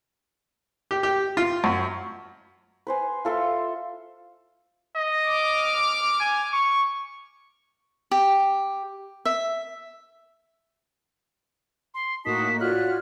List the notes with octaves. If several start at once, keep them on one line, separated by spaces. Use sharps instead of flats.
G4
G4
F4
F#2
B4 C5 G#5
F4 A4 E5 C6
D#5
D6 F6
G#5
C#6
G4
E5
C6
A2 A#3 D#4 F#4 A5 D#6 B6
F4 F#4 C#5 D5 F6 F#6